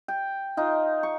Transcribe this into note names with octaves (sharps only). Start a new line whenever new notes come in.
G5
D#4 F4
C#6